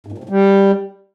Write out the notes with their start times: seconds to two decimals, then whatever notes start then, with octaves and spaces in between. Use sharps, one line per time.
0.06 G#2
0.12 A#2
0.18 C3
0.24 A2
0.29 G3